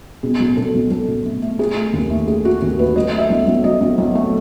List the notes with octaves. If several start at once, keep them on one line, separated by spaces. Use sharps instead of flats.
B2 G#4
B1
B2 A4
B1
B1 A4
B2
A3
A3
A3 G#4
A3
D#2
A3
A3 G#4
A3 F#4
D#2 F#4
A3 B4
F#3 D#5
A3
E5
B1
B1
F#3 D#5
B1
B1
A3